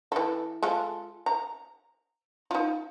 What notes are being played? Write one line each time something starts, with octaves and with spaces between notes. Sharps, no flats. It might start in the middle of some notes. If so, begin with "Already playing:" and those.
E3 A4
G#3 F4 A4
A#5
D#4 F4